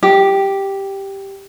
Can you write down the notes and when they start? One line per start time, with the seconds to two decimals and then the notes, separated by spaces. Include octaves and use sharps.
0.03 G4